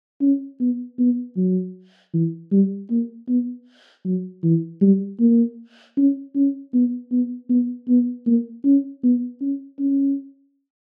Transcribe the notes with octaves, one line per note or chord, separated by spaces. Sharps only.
C#4
B3
B3
F#3
E3
G3
A#3
B3
F#3
E3
G3
A#3
C#4
C#4
B3
B3
B3
B3
A#3
C#4
B3
C#4
C#4